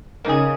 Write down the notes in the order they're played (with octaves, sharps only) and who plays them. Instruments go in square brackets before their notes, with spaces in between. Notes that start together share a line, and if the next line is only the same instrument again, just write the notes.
[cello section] C#3 [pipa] A#3 D#4 G#4